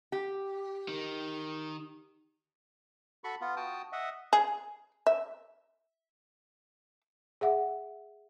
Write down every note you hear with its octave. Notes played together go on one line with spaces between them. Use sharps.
G4
D#3
F#4 A4 B5 C#6
B3 F4
F#4 G5 A5 D#6
D#5 E5 F#5
G#4
E5
G#4 E5 F#5